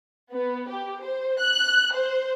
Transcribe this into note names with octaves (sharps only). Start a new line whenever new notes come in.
B3
G4
C5
F#6
C5